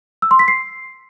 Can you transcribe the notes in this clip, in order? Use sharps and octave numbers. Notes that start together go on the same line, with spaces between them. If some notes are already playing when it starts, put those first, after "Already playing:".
E6
C6
B6
C7